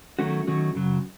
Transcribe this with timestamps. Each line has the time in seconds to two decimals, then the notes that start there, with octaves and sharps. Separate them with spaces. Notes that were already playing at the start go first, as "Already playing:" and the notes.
0.19 D#3 F#3 A3 C#4 F#4
0.47 D#3 F#3 A3 C#4 F#4
0.75 F#2 C#3 F#3